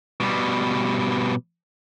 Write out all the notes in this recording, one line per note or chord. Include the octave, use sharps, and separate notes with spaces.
B2 G3